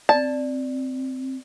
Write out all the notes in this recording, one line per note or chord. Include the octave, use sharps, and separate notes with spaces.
C4 D5 A5